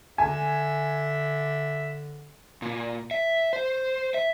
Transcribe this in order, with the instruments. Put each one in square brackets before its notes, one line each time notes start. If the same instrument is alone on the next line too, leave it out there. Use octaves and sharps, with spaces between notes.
[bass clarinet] D3 [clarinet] E5 [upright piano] G#5
[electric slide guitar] A#2
E5
C5
E5